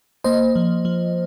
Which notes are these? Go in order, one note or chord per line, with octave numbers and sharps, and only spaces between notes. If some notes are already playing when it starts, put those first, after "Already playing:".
A#3 C5 D#5
F3
F3